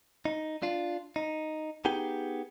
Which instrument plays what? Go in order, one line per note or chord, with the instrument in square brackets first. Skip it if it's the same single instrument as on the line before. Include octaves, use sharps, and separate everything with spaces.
[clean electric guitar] D#4
D4 F4
D#4
B3 D#4 G4 G#4 G5